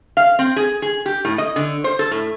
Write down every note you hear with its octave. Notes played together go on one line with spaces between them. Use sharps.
F5
C4
G#4
G#4
G4
A2
D#5
D3
C5
A4
A2